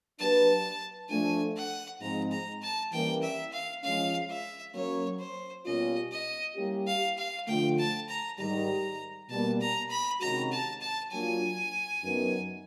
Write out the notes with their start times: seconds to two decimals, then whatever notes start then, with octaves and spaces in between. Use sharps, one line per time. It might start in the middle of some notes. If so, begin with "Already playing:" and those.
0.19 F#3 A#3 D4 G4 B4 A5
1.09 F3 A3 D4 G#5
1.56 F#5
2.01 G#2 F3 G#3 C4 A#5
2.31 A#5
2.62 A5
2.92 E3 G3 A#3 C#4 G5
3.23 E5
3.52 F5
3.83 F3 G#3 C#4 F5
4.29 E5
4.74 F#3 A#3 C#4 C#5
5.19 C5
5.65 B2 G3 A#3 C#4 F4 D#5
6.11 D#5
6.56 G3 A#3 C#4 E4 G4
6.87 F5
7.18 F5
7.47 D3 F3 A3 G5
7.78 A5
8.09 A#5
8.38 G#2 D#3 G3 A#5
9.29 B2 G3 A#3 A5
9.61 A#5
9.90 B5
10.21 C3 D#3 G#3 C#4 F#4 A#5
10.51 A5
10.81 A5
11.12 F#3 A#3 D4 F4 G#5
12.03 F#2 D#3 F#3 B3